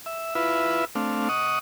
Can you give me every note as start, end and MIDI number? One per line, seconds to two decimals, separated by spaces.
0.06 0.35 76
0.35 0.85 64
0.35 0.85 65
0.35 0.85 71
0.35 0.85 76
0.95 1.29 57
0.95 1.29 60
0.95 1.29 62
0.95 1.29 77
1.29 1.59 75
1.29 1.59 78
1.29 1.59 85
1.29 1.59 87